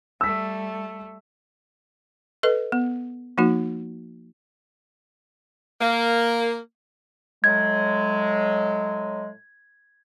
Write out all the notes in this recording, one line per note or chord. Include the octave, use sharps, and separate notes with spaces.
G3 A3 E6 B6
A4 B4 D#5
B3
F3 A#3 D#4 F#4
A#3
A2 F#3 G#3 G#6